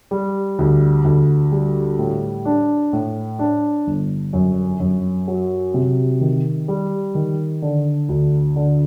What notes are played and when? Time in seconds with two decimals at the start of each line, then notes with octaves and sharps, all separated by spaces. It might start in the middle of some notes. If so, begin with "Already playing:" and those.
0.11 G3
0.59 D2
1.04 D2
1.52 G3
1.99 A2
2.45 D4
2.93 A2
3.39 D4
3.87 G1
4.33 F#2
4.80 F#2
5.28 F#3
5.74 C3
6.21 D#3
6.68 G3
7.15 D#3
7.62 D3
8.09 D2
8.56 D3